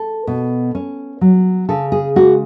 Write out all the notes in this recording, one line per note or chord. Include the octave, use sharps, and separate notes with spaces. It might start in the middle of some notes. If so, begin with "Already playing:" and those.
Already playing: A4
B2
C#4
F#3
C#3 A4
G#4
G#3 F#4